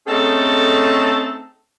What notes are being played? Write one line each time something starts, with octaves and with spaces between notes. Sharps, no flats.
A3 C4 C#4 D#4 G#4 A4